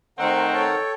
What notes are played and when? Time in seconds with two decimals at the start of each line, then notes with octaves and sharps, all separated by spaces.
0.19 D#3 A3 C4 A#4 C5 D#5 F#5
0.53 A4 C#5 G5